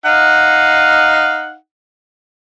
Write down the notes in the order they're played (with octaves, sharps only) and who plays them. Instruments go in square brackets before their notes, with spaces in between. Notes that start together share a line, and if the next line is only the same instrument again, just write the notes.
[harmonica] D#4 F5 F#5